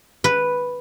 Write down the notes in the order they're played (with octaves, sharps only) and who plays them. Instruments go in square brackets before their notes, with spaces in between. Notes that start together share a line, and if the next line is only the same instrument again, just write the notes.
[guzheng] B4